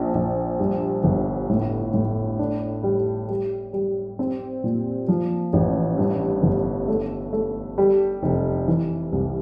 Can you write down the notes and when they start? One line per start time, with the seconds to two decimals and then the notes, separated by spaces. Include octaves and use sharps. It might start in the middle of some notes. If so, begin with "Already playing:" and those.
Already playing: A#1
0.15 A#1
0.60 G2
1.04 G1
1.49 A2
1.94 A2
2.39 D4
2.83 G3
3.29 G3
3.73 G3
4.19 C4
4.64 A#2
5.08 F3
5.53 A1
5.98 G2
6.43 G1
6.88 A3
7.33 A3
7.78 G3
8.23 F1
8.68 E3
9.12 C2